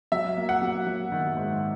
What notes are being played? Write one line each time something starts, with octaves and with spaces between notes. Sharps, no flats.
F#3 E5
A#3
F#5
F#3
F#3
D#3
G#2